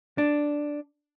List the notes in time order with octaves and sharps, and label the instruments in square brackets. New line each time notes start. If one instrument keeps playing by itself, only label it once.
[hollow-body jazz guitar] D4